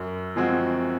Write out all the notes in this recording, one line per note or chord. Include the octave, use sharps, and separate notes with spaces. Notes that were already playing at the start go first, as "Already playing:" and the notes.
Already playing: F#2
F3 G#3 C4 F#4